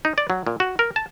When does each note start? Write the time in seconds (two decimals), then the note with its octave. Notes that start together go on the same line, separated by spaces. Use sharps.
0.05 D#4
0.18 D5
0.30 F#3
0.47 A#2
0.60 F#4
0.79 A#4
0.96 A5